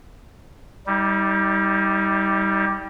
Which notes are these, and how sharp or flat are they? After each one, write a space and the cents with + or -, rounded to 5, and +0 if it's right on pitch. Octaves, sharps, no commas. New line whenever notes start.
G3 +0 D#4 +40